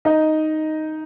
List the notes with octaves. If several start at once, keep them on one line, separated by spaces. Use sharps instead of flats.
D#4 D#5